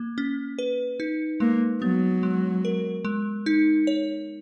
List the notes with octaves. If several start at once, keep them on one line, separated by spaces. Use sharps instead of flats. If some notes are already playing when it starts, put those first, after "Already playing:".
Already playing: A#3
C#4
B4
D#4
G#3 A#3
F#3 B3
G#3
A#4
G#3
D#4
C#5